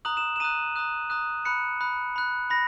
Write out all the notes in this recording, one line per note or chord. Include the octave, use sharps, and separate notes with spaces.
A#5 D#6 F#6 F#7
E7
E7
A#5 D#6 F#6 D#7
A#5 D#6 F#6
A#5 D#6 F#6
B5 F#6 C#7
B5 F#6
B5 F#6
B5 A#6